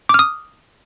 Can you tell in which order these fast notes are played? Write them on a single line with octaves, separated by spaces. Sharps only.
D6 F6 D#6